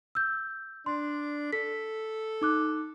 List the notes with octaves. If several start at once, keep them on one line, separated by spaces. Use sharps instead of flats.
E6 G6
D4 C6
A4 B6
D#4 D6 F#6